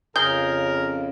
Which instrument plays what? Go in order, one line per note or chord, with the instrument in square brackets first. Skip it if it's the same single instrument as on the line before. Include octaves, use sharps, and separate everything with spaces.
[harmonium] F2 C#3 [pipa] G#4 [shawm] A#4 [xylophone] G6 G7